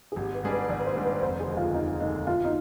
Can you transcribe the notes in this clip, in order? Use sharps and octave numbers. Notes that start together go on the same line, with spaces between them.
G#4
G#1 G4
B4
G#2 G3 D4 G#4
B4
G#1 D5
B4
C5
G#2 G3 D4 G#4
B4
F1 C5
G#4
D#2 D3 G#3
F4
F1 D#4
D#2 D3 G#3 D#4
B2 F4
D#4